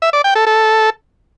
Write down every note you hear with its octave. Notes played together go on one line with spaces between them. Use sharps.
E5
D5
G5
A4
A4